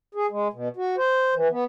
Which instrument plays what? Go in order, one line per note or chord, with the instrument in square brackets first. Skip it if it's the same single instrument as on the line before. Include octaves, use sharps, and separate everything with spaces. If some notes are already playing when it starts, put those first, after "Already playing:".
[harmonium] G#4
G#3
B2
F#4
C5
E3
B3